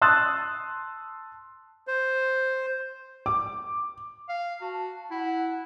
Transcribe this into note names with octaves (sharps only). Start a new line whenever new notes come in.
A5 C6 D#6 E6 F#6 A6
C5
D6
F5
F#4 A5
E4 F#5